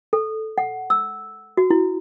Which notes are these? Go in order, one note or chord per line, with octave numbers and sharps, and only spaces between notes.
A4
F#5
E6
F#4
E4